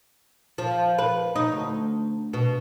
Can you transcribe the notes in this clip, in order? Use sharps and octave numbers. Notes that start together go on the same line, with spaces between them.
F3
B4
D#4
D2
B2